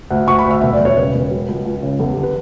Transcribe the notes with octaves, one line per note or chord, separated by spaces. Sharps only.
D2
D2 C#6
B5
D2
E5
E1 E5
D5
E1
C#5
C#3 B4
E1
F#3
C#2
C#2
C#3
E2 A4
G4
D3
B4